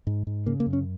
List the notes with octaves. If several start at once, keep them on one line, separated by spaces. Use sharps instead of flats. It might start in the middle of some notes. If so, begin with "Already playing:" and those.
G#2
G#2
C#3 A#3
A#3
F#2
C#4